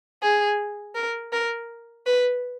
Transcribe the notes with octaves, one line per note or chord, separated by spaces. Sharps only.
G#4
A#4
A#4
B4